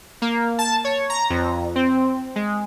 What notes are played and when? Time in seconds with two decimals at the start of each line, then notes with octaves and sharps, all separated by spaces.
0.22 A#3
0.59 A5
0.84 C#5
1.10 A#5
1.30 F2
1.76 C4
2.36 G#3